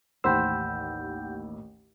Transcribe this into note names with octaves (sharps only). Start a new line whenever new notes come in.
A1 D#2 C5 F#5 G5 B5 E6 G6